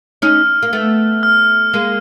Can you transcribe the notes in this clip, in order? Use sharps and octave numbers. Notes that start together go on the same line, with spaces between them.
C#4 D#4 F6
A#3
A3 B3
F6
G#3 A#3